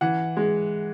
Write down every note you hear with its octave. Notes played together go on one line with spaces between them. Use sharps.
E3 F#5
G#3